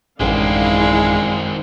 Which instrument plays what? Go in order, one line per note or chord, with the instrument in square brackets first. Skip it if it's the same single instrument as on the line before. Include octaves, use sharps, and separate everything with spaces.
[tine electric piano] A1 F#2 [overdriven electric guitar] D#3 C4 [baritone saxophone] G#3 [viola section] D4 E4 F5